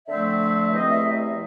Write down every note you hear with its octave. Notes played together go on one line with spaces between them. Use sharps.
D3 F3 A3 C4 E5
E2 C3 F3 A3 C4 D#5
E5